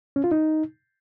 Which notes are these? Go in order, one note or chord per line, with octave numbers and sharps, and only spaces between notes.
C#4
F4
D#4